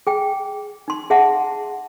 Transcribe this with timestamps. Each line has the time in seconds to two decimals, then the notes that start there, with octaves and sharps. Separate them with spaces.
0.07 G#4 G5
0.88 D#4 C6
1.10 G#4 E5 F#5 A5